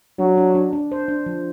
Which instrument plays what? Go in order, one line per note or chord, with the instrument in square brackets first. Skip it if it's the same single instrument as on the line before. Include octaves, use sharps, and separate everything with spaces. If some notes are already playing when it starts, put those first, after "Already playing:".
[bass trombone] F#3 [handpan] D4
[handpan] D4
D4
D4
C5
D4
F3